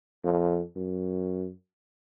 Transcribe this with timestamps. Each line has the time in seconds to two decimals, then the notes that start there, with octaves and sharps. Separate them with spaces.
0.24 F2
0.76 F#2